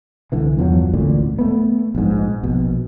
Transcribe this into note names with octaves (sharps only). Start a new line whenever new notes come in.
C2 D3 E3
E2 G2 F3 F#3
A1 D2 A#2 D3
A3 B3
A#1 G#2
A#1 B2